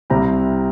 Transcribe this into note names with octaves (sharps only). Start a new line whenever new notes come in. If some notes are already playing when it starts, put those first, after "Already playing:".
C2 C3 G3 C4 E4 G5 A#5